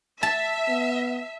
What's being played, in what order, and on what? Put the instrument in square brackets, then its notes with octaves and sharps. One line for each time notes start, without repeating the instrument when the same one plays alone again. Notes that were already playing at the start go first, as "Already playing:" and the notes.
[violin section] E5 [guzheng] A5
[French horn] B3